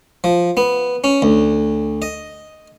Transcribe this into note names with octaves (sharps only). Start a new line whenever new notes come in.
F3
B3
C#4
D2
D#5